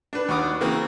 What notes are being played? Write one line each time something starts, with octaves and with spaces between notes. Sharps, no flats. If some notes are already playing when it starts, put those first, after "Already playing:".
D4 B4
D#2 F#4 D6 D#6
C#3 E3 A#3 C4